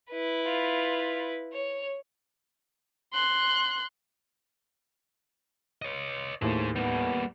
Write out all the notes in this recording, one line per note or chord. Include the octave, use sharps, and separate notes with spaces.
E4 B4
F4
C#5
C6 F#6
C#5 D#5
D#2 A2 G#4 C5
G3 A#3 B3